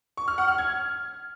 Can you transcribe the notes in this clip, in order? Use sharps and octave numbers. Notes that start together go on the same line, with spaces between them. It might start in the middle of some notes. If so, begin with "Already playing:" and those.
C#6
F6
F#5
F6
G#6